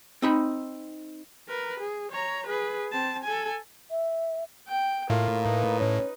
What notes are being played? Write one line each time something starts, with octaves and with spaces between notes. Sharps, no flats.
C4 D#4 B5
A#4 B4
G#4
C#5 A#5
G#4 B4
C4 A5
A4 G#5
E5
G5
A2 A#3 F4
D#4 B4
C#4